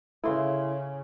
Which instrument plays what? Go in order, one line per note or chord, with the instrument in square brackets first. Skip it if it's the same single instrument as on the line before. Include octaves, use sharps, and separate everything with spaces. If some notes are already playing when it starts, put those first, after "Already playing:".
[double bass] C#3 [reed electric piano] E4 C6 [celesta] A4 E5 F5